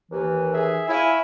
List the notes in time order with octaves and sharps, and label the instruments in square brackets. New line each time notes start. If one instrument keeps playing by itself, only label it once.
[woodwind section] D#2 E3
[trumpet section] G#4 E5
[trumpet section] E4 [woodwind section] C#5 F5 G#5